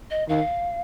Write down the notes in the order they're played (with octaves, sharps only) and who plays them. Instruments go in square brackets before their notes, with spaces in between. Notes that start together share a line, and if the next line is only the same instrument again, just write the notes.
[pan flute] D#5
[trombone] D#3 [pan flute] F5